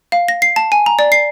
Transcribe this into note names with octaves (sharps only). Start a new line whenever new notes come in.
F5
A#6
C7
A5
G#5
A#5
D5
C7